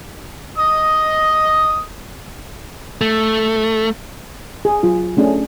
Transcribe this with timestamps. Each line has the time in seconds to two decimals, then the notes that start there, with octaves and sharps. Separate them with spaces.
0.58 D#5 D#6
3.01 A3
4.65 G#4
4.83 F#3 F4
5.17 A3 C#4 D4 G#4